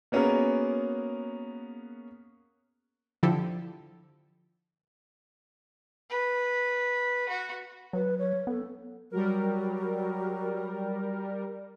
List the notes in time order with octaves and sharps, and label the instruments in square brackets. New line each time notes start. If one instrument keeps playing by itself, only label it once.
[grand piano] A#3 B3 C#4 F#4 G#4 A#4
[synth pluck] D3 F3 D4 E4 G4 A4
[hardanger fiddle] B4
F#4
[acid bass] F#3 [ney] B4
[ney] C#5
[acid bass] B3 [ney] A4
[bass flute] F#3 [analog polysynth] G3 A#4